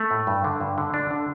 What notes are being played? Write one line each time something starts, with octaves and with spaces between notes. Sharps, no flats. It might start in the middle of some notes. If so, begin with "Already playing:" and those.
Already playing: A3
A2
G2
D3
G2
D3
D3 D4
D3